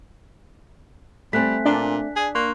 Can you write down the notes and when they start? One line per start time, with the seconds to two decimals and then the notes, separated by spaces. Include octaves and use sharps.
1.33 G3 A3 C4 G#5 F#6 B6
1.65 A#2 D4
2.16 G#4
2.35 A#3 C6 C#6 F#6